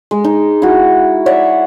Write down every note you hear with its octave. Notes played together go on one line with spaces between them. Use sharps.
G#3
D#4
E4 F#4
C#5 D5 E5 F#5